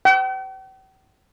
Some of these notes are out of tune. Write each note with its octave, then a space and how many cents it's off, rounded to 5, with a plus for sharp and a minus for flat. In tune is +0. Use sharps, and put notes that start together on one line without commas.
G5 -45